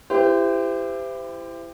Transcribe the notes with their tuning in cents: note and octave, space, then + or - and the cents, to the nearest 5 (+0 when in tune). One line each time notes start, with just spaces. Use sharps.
E4 +25 G4 +15 C5 -35